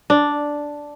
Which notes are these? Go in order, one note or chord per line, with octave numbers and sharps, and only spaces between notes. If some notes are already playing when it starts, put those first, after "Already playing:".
D4